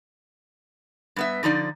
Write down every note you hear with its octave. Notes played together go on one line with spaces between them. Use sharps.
G2 B3 E5
D3 F3 D#4 D5